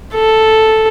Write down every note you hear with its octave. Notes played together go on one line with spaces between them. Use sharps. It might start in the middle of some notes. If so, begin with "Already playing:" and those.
A4